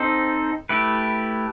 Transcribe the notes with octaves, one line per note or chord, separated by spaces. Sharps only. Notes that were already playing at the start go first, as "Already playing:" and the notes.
Already playing: C4 D#4 A4 C5
A3 E4 G4 B4